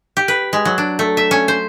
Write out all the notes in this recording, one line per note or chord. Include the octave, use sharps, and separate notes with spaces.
G4
B4
G#3
F#3
D4
A3
E5
C#4
C5